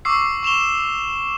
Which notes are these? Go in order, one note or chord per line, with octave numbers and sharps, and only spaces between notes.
C#6 D6 E6 C7
C#6 E7 F7 G7